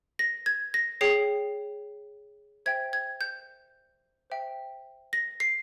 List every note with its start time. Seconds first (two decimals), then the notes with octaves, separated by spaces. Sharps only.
0.19 A#6
0.46 G#6
0.74 A#6
1.01 G#4 C#5 G5 C7
2.66 C5 E5 G5 G#6
2.93 G#6
3.21 G6
4.30 C5 E5 G5
5.13 A#6
5.40 C7